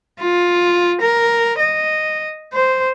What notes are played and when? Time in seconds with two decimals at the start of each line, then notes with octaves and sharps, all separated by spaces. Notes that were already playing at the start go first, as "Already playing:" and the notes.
0.20 F4
1.01 A#4
1.59 D#5
2.53 C5